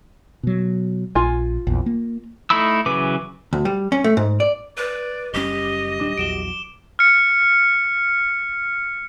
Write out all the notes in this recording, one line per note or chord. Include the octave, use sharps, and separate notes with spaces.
B2 F#3
A#1 F4 G#5
A#1 E2
A#3
A3 D#4 E4 B5 E6
C#3 E3 F#3 B4 D6
D2
G3
C#4
A3
G#2
D5
B4 D5
F#1 G3 C#4 G4 D#5 G7
D#1 G3 D4 D6
A#1 E2 F#3 D7 E7 G7
F6 C#7